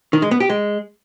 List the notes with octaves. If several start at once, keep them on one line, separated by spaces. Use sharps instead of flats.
D#3
G#3
B3
G4
G#3